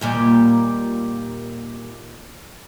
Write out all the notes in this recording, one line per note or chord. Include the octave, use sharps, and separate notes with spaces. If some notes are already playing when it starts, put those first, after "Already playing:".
D#2 A#2 G3